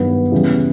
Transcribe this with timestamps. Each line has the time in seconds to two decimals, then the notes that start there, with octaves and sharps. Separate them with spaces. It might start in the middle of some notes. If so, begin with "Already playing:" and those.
Already playing: G2 D#3 F#3 B3
0.32 E2 C#3 E3 G3